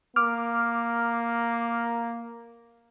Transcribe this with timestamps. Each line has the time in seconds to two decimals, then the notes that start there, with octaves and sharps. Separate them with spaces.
0.16 A#3 D6 F6